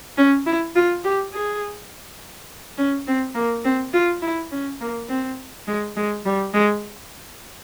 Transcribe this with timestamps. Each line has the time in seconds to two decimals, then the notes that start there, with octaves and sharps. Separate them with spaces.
0.17 C#4
0.46 E4
0.76 F4
1.04 G4
1.33 G#4
2.78 C#4
3.08 C4
3.35 A#3
3.64 C4
3.94 F4
4.22 E4
4.51 C#4
4.80 A#3
5.09 C4
5.67 G#3
5.97 G#3
6.26 G3
6.54 G#3